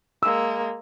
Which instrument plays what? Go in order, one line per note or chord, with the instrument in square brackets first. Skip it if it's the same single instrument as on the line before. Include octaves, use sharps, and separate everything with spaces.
[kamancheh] G#3 A#3 [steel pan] E6